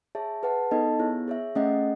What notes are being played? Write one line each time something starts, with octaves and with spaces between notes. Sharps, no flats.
G#4 C#5 E5 A5
G#4 B4 F#5 A5
B3 D#4 A4 D#5 A5
B3 E4 G#4 C#5
G#4 C#5 E5
A3 C#4 G#4 D#5 F#5